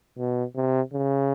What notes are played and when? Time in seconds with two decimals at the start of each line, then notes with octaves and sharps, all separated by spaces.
0.18 B2
0.55 C3
0.93 C#3